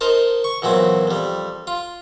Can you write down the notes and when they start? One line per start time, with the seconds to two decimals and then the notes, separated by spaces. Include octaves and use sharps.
0.01 D#4 A#4 C5 A5
0.44 C#6
0.62 E2 A#2 F#3 C4
1.07 F2 G3
1.67 F4